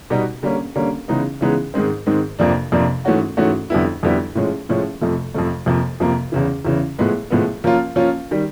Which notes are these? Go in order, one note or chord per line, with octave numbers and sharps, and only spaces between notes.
B2 G3 B3 D#4 F#4
D3 G3 A#3 C#4
D3 G3 A#3 C#4
C#3 E3 G#3 B3 D#4
C#3 E3 G#3 B3 D#4
G#2 D#3 G#3 C4
G#2 D#3 G#3 C4
F2 C3 F3 A#3 D4
F2 C3 F3 A#3 D4
G#2 E3 A3 C#4 F#4
G#2 E3 A3 C#4 F#4
F2 D3 G3 B3 E4
F2 D3 G3 B3 E4
A2 F3 G#3 C#4
A2 F3 G#3 C#4
F2 C3 F3 A3
F2 C3 F3 A3
F2 C3 F3 A#3
F2 C3 F3 A#3
E2 C#3 E3
E2 C#3 E3
A2 F3 G#3 B3
A2 F3 G#3 B3
F3 A#3 C#4 F4
F3 A#3 C#4 F4
D#3 G3